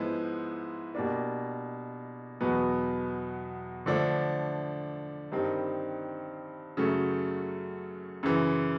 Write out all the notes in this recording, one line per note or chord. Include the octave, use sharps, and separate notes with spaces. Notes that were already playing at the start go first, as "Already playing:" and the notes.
Already playing: G#2 F3 G#3 B3 E4
B2 G3 A#3 D4
E2 B2 F#3 B3
D3 F3 A3 D4
G2 D#3 G3 C4 D#4
F#2 C#3 F#3 A3
F#2 C#3 E3